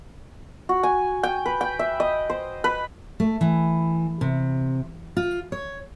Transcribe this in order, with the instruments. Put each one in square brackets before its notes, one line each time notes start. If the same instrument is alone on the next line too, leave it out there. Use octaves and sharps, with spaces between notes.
[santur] F#4
G#5
G5
B4
G5
E5
D#5
C5
B4
[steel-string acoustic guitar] A3
E3
C3
F4
C#5